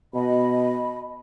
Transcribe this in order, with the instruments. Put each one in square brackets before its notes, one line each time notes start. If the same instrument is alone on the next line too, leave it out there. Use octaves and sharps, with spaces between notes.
[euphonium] B2 [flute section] D#5 B5